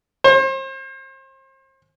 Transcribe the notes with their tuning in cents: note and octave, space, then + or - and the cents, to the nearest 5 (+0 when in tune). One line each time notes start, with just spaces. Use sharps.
C5 +35